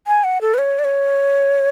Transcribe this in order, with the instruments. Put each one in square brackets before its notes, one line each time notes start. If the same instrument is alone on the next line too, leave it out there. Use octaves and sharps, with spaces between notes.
[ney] G#5
F#5
A4
B4
C#5
D5
C#5